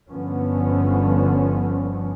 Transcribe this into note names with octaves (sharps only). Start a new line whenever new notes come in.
G1 D3 F3 B3 C#4